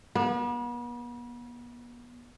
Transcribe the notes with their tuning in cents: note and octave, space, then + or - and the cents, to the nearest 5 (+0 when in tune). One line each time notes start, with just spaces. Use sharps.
B3 -40